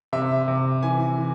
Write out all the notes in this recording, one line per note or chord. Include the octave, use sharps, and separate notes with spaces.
C3 E5
C3
E3 G#5
E3